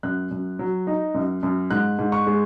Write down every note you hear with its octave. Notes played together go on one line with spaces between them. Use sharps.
F#2 F#6
F#2
F#3
D#4
F#2
F#2
G#2 F#6
G#2
C#6
G#3